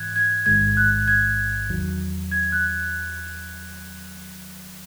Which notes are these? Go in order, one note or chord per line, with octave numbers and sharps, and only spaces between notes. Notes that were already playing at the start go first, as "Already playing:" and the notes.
Already playing: G#2 E3 F#6 G#6
G#6
A1 G#2 D#3 G#3 G#6
F#6
G#6
E2 D#3 F#3
G#6
F#6